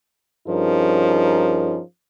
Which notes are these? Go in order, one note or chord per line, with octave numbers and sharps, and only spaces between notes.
G2 F3 C#4 D#4 G#4 A#4